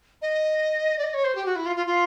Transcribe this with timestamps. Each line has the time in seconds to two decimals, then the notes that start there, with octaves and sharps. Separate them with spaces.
0.22 D#5
0.98 D5
1.04 D#5
1.14 C#5
1.24 C5
1.35 G4
1.46 F#4
1.56 E4
1.66 F4
1.76 F4
1.87 F4